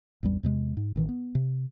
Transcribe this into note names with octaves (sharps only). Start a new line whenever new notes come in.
A1 E2 G2 G3
E2 C3 G#3
G#2
A1 D#3 E3
B3
C3